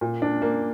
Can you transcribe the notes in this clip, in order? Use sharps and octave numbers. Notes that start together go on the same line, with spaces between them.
A#2
D4
A#3